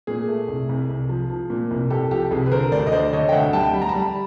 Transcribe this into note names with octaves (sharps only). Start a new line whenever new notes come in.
A#2 G#4
A3
C2
C2
C2
F3
F3
A#2
C2
C2 G4 A4
F3 G4 A4
C2 G#4
B4
D3 A#4 C5
D2 C5 D5
D#5
D3 C5 D5
D3 C#5 D#5
G5
D2 E5 F#5
G3 G5 A5
G3 B5
A#5
A5 B5
G3